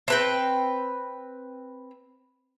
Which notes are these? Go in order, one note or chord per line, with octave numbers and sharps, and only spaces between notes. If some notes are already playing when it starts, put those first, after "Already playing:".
C4 B4 G5